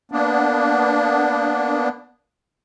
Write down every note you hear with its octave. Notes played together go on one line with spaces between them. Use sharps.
A#3 B3 D4